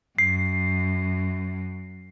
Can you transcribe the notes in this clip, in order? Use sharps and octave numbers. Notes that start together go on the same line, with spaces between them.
F#2 C7